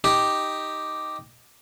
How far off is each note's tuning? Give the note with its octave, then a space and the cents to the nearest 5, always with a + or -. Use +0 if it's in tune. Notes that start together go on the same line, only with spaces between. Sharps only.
D#4 +0 G4 +0